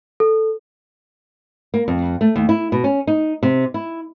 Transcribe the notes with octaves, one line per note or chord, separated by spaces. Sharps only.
A4
A#3
F2
A3
D#2
E4
B2
C#4
D#4
C3
E4